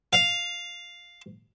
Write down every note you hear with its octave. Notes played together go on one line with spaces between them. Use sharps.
F5